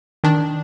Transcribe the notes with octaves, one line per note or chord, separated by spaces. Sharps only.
D#3 D4